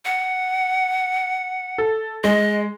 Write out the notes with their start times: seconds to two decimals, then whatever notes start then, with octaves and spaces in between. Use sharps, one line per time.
0.05 F#5
1.78 A4
2.24 G#3 D#5